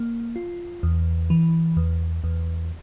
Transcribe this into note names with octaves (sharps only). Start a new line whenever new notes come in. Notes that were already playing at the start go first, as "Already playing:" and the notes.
Already playing: A#3
F4
E2
E3
E2
E2